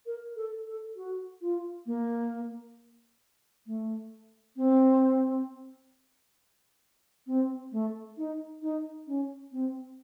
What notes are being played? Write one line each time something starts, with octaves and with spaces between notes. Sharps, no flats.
A#4
A4
A4
F#4
F4
A#3
A3
C4
C4
A3
D#4
D#4
C#4
C4